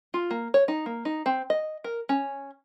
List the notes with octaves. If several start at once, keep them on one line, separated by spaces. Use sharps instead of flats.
F4
A#3
C#5
D#4
A#3
D#4
C4
D#5
A#4
C#4